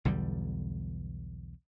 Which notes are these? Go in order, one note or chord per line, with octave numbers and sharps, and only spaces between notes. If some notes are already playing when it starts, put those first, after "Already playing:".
B1 E2 D3 G3